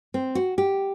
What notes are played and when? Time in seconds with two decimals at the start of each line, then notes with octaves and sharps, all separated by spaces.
0.14 C4
0.35 F#4
0.58 G4